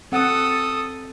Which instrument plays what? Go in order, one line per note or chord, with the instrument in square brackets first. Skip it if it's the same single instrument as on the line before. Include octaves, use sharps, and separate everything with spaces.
[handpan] C4 F#5 [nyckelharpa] A4 D#6